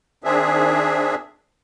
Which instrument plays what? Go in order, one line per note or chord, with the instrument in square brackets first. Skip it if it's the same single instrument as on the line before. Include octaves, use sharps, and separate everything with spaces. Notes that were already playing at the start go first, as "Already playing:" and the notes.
[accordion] D#3 C4 D4 G#4 E5